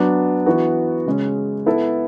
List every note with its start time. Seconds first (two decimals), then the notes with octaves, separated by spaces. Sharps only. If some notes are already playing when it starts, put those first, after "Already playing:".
Already playing: F#3 B3 D4
0.46 E3 B3 F#4
1.06 C#3 G#3 C#4
1.66 B3 E4 A4